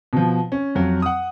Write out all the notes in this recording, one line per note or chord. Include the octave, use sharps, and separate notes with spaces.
B2 F3
C#4
F2 F#3
F#5 D#6